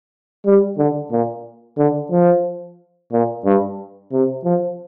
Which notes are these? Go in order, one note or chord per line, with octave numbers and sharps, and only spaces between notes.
G3
D3
A#2
D3
F3
A#2
G2
C3
F3